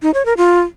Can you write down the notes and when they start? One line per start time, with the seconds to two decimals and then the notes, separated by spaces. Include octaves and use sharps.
0.02 D#4
0.14 C#5
0.25 A#4
0.37 F4